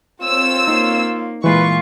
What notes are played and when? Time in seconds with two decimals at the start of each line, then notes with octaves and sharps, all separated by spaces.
0.21 C4 F4 C#5 E6
0.68 A#3 D#4
1.44 A#2 E3 G#3 F4 B4 C#6